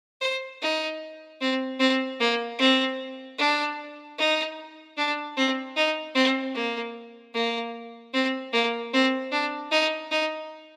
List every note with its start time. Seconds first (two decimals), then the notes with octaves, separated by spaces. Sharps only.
0.21 C5
0.62 D#4
1.41 C4
1.79 C4
2.20 A#3
2.59 C4
3.38 D4
4.18 D#4
4.97 D4
5.37 C4
5.76 D#4
6.15 C4
6.54 A#3
7.34 A#3
8.14 C4
8.53 A#3
8.93 C4
9.32 D4
9.71 D#4
10.11 D#4